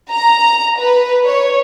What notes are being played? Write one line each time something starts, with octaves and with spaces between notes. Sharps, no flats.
A#5
B4
C#5